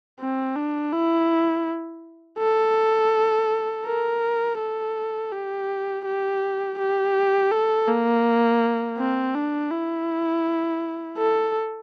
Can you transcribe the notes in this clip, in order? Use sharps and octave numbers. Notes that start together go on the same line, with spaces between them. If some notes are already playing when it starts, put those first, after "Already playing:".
C4
D4
E4
A4
A#4
A4
G4
G4
G4
A4
A#3
C4
D4
E4
A4